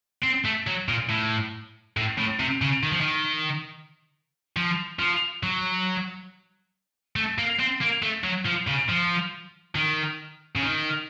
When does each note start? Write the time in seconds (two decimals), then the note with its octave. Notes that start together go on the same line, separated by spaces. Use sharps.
0.24 C4
0.45 A3
0.67 F#3
0.89 A#2
1.10 A2
1.97 A2
2.19 A2
2.40 C3
2.62 C#3
2.83 D#3
2.92 F3
3.01 D#3
4.57 F3
4.99 F3
5.43 F#3
7.16 A3
7.38 A#3
7.59 C4
7.81 A#3
8.02 A3
8.24 F#3
8.46 F3
8.68 C#3
8.89 F3
9.75 D#3
10.55 C#3
10.62 D#3